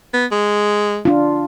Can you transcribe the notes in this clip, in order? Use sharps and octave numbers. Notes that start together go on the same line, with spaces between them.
B3
G#3
D4 F4